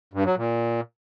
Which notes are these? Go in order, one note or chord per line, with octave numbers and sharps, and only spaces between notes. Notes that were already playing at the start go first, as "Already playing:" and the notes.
G2
F#3
A#2